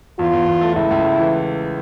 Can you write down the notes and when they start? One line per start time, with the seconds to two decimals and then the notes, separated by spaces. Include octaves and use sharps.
0.19 E2 F4
0.33 E2
0.47 E2
0.61 A3
0.76 C#2 E4
0.91 C#2
1.04 C#2
1.19 E3